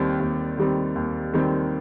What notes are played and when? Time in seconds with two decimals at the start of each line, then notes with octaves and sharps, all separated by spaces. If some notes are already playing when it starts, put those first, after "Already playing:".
Already playing: D#2 D#3 G3 C4
0.20 D#2
0.58 D#3 G3 C4
0.95 D#2
1.33 D#3 G3 C4